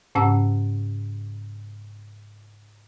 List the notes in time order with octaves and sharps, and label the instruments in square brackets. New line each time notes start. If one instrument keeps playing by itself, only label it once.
[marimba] G#2 C#3 C#4 F#5 A#5 E6